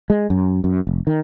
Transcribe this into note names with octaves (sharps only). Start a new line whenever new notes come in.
G#3
F#2
F#2
F1
D#3